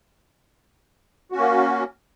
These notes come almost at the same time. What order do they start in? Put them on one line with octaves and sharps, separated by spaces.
F#4 C#4 A#3